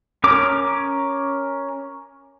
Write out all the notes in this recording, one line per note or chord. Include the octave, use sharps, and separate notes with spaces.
C#4 A#4 D6